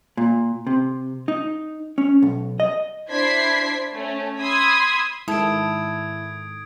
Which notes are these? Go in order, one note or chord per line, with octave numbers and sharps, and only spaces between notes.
A#2
C3
D#4
C#4
B1
D#5
D4 E4 C5 G#6 B6 C7
A3 C#4
B5 C6 D#6 E6 G#6 B6
G#2 D#3 E4 A4 D#6 G#6 D7